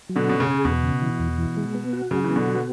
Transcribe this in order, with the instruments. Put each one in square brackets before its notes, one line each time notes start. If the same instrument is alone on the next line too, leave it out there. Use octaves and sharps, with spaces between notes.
[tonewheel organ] F#3
[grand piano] B2 D3
[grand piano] B2 [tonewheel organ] C#4
[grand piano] C#3
[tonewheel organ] G#4
[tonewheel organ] E2 [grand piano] B2
[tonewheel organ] C#3
E3
E2
E3
G#3
B3
F#4
[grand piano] C#3 [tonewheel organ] F#3
[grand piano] E3
[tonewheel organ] B3
[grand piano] B2 D3
[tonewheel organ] F#4